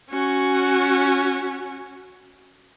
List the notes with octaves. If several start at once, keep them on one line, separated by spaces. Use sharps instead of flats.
C#4 F#4